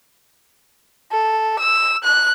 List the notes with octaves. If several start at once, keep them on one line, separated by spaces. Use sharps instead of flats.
A4
E6
F#6